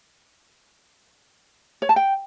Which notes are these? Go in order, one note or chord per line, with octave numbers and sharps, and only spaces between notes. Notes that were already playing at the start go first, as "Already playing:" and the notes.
C#5
A5
G5